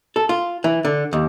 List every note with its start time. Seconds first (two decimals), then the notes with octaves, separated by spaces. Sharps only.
0.16 A4
0.29 F4
0.64 E3
0.85 D3
1.13 D#2